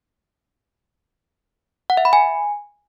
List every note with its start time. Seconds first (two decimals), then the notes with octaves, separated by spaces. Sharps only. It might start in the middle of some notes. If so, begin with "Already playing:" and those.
1.90 F#5
1.97 E5
2.05 B5
2.13 G#5